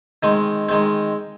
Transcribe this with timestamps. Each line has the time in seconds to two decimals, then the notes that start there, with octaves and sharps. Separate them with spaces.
0.23 D#3 G#3 C4
0.69 D#3 G#3 C4